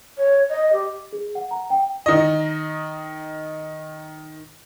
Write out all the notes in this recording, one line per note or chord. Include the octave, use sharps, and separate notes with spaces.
C#5
D#5
G4
G#4
F#5
A#5
G5
D#3 D#5